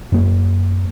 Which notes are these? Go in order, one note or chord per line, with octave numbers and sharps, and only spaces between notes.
F#2 A#3